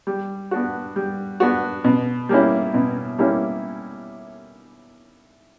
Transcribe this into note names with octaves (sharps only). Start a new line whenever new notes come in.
G3
B3 D4 F#4
G3
B3 D4 F#4
B2
G3 A#3 C#4 E4
B2
G3 A#3 C#4 E4